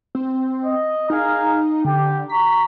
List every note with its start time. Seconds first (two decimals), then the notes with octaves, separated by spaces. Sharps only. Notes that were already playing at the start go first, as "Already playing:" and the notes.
0.15 C4
0.64 D#5
1.10 D#4 G#4 A#4 F5
1.84 D3 G4
2.30 F#4 A#5 C#6 B6